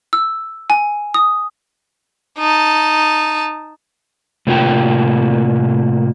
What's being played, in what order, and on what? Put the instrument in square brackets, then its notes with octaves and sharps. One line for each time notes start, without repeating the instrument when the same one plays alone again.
[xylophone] E6
G#5
D#6
[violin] D#4 A5
[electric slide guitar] A2 C3 A#3 F4 F#4 G5